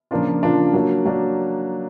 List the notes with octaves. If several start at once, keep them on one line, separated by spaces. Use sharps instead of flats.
C#3 F3 A#3 D4 F4
C#3 F3 A#3 D4 F4
F#3 A#3 D4
F#3 A#3 D4